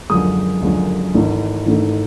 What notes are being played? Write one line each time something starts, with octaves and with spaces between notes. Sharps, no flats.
F#1 F#2 D3 F3 G#3 D#6
F#1 F#2 D3 F3 G#3
G#1 G#2 E3 A3
G#1 G#2 E3 A3